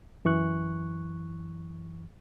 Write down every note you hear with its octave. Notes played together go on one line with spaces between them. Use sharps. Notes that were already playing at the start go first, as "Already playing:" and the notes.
F#2 E3 C#6 F#6